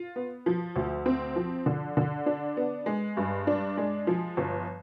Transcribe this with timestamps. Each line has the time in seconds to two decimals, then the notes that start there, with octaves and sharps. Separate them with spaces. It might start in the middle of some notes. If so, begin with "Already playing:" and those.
Already playing: F4
0.16 B3
0.46 F3
0.76 D2
1.06 C4
1.36 F3
1.66 D3
1.97 D3
2.26 D4
2.57 B3
2.86 G#3
3.17 G2
3.47 D4
3.77 G#3
4.07 F3
4.37 G1